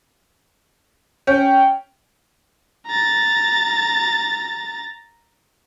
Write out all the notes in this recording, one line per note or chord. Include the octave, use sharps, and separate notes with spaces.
C#4 G5
A#5 A6